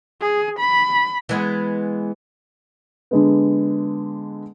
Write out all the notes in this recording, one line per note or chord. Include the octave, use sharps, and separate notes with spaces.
G#4
B5
E3 G#3 B3
D3 G#3 B3